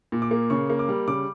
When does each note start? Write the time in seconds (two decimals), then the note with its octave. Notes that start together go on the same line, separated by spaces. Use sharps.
0.12 A#2
0.22 D6
0.31 A#3
0.50 C#3 C#6
0.70 A#3
0.79 D6
0.89 G3
1.08 C#3 D6